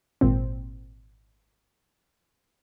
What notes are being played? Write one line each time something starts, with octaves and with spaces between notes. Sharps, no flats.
G#1 A#2 C4